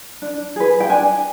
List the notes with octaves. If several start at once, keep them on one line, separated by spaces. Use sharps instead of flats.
D4
G#4 B4
G5
D4 G#5